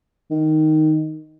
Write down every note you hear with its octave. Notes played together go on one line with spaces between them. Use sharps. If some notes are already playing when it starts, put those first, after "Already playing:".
D#3